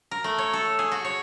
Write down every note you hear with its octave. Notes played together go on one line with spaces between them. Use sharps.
A#4
A3
C#5
A4
G#4
F#4
C#5